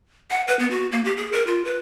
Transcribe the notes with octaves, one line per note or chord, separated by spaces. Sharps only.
F#5
B4
B3
F#4
A#3
G4
G#4
A#4
F4
B4